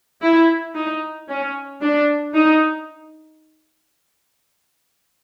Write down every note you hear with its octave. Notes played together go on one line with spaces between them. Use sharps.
E4
D#4
C#4
D4
D#4